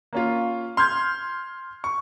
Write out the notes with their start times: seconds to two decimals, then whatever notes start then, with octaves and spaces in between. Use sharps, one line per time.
0.13 A#3 C#4 F4
0.77 C6 F6 G6 G#6
1.84 C#6